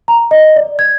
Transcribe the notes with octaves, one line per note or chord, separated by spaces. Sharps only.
A#5
D#5
D5
G#6